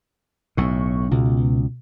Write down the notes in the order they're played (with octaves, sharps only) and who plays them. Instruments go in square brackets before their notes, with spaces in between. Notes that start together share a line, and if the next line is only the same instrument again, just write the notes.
[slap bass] B1 A2 [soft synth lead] C#6
[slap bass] C#2 [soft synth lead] B2